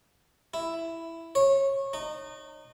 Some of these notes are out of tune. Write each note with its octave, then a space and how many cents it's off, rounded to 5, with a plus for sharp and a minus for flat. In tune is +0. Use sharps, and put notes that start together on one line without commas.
E4 +5
C#5 -20
D#4 -30